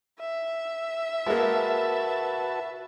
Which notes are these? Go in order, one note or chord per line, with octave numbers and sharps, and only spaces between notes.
E5
G#3 A#3 F#4 B4 A5